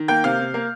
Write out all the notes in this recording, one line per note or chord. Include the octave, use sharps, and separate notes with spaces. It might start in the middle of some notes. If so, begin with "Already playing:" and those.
Already playing: D#3
A#3 G5 G6
C3 F5 F6
C3
A#3